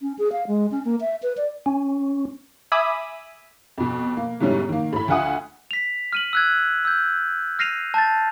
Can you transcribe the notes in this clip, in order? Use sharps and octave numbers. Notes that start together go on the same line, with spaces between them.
C#4
G#4
F5
G#3
C#4
A#3
E5
B4
D5
C#4
E5 G#5 B5 D6 D#6
F2 B2
A#3
G#2 B2 D3 G3 C#4 E4
D#3 A#3
A2 B5
D2 F4 E5 F#5 G#5 D#6
B6 F7
F6 D#7 F#7
E6 F#6 G#6
E6 G6
F6 A#6 C7 D#7 F7
A5 G6 A6